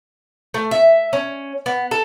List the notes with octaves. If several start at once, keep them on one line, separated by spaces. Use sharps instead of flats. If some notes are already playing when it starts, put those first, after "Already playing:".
A3
E5
C#4
B3
A4